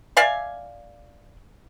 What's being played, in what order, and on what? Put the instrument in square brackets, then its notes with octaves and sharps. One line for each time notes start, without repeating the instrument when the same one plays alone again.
[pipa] D5 E5 F5 G#5